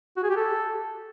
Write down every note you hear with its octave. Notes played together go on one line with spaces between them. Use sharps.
F#4
G#4
G4
A4